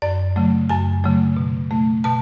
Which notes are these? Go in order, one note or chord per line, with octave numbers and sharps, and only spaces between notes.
F#2 D5
C#3 F#3 A3
F#2 G#5
C#3 F#3 A3
B2
A3
B2 A5